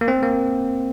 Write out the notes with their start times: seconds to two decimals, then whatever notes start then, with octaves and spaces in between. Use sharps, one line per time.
0.01 A#3
0.08 C4
0.23 A#3